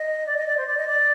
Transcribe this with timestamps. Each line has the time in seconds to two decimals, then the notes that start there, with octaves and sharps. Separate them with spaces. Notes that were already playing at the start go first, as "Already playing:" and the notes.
Already playing: D#5
0.27 D5
0.37 D#5
0.47 D5
0.57 C5
0.67 D5
0.78 D#5
0.87 D5